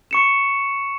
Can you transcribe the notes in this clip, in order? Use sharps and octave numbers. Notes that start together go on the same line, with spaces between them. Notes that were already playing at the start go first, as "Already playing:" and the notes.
C#6 C#7 E7